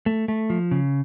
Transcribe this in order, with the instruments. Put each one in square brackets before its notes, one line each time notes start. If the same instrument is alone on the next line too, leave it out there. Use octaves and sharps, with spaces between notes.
[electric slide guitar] A3
A3
F3
C#3